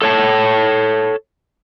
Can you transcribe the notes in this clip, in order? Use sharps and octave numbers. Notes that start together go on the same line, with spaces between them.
A4 C#5 A5